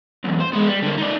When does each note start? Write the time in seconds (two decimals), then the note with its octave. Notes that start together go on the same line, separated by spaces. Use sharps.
0.24 B1 E2
0.40 C5
0.53 G#3 B3
0.67 G3
0.83 D3 A#3
0.98 D#4 D5